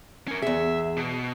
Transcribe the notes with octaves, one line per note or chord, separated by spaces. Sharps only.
C#4 A#4
E2 G#4 E5
B2